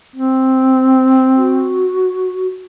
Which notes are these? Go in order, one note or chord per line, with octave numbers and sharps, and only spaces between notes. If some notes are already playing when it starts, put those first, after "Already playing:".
C4
F#4